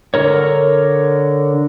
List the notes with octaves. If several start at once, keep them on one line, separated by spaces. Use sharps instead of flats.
D3 A#4 C#5